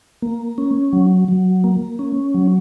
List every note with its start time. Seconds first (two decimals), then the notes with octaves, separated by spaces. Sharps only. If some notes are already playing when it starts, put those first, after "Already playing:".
0.22 A#3
0.58 C#4
0.93 F#3
1.28 F#3
1.64 A#3
1.99 C#4
2.34 F#3